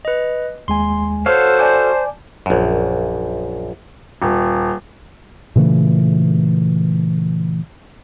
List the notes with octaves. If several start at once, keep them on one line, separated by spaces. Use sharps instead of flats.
B4 D#5
D#2 G#3 G#5 C6
F#4 A4 C5 C#5 F5
D5 G#5 A5 D6 G6
A#1 F#2
D#1
A#2 C#3 E3 A3